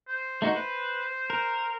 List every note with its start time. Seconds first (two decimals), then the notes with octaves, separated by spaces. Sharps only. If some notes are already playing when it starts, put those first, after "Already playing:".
0.08 C5
0.42 A3 D#4 F#4
0.56 B4
1.30 A#4